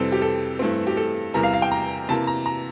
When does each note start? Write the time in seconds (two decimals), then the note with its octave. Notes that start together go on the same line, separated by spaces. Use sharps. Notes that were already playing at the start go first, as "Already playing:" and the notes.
Already playing: F2 C3 E3 G3 C4 A4
0.12 G4
0.22 A4
0.59 G2 E3 A3 C4
0.87 G4
0.97 A4
1.34 E2 C3 E3 G3 A#4
1.43 F5
1.54 F5
1.62 G5
1.71 A#5
2.09 C3 E3 A#3 A5
2.27 A#5
2.46 A#5